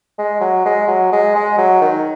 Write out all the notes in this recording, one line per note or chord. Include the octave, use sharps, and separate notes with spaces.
G#3
F#3
G#3
F#3
G#3
G#3
F#3
D#3